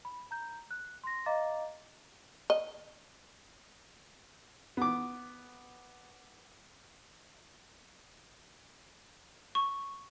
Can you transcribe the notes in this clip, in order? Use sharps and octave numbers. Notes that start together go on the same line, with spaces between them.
B5
A#5 G6
F#6
C6 A#6
D#5 F5 A#5 D6 A6
D#5
B3 D6
C#6